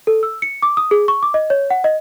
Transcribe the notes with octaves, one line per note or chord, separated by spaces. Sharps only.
A4
E6
C#7
D6
D#6
G#4
C#6
D6
D#5
C#5
F#5
D#5